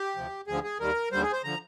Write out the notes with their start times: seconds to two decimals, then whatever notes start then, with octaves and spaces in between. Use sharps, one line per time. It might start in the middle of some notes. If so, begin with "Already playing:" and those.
Already playing: G4
0.16 D2 C3 F3
0.47 D2 D3 F3 G#4
0.64 G#4
0.80 D#2 D#3 G3 A#4
1.12 D#2 D3 G3 C5
1.22 G#4
1.32 C5
1.44 D3 F3 A#5